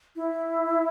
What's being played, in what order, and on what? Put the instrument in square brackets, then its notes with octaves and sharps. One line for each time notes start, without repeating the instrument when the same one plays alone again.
[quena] E4